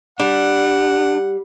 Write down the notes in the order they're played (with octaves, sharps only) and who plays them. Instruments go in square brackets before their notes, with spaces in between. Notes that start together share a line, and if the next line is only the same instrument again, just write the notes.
[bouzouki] G3 [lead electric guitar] D4 [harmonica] F#5